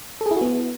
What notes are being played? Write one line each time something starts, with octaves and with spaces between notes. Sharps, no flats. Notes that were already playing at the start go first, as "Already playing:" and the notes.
A4
G#4
E4
F#4
B3